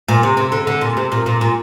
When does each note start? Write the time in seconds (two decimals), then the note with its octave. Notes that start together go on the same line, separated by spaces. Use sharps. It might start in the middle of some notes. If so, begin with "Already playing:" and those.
0.08 A#2
0.23 C3
0.37 C3
0.52 D3
0.67 D3
0.81 A#2
0.97 C3
1.12 A#2
1.26 A#2
1.41 A#2